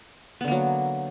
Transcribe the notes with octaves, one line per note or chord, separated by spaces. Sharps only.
D3 F#3 A#3 B3